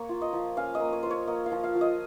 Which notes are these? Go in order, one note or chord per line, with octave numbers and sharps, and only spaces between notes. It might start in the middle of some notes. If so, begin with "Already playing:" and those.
Already playing: A#3 C#5
F4
D#5
F3
C#4 F5
D#5
A#3
C#5
F4 C5
C#5
A#3 D#5
F5
F3
F5
F3
D#5